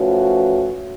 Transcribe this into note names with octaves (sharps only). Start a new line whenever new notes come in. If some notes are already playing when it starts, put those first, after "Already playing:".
Already playing: F3 A3 C#4 F#4 B4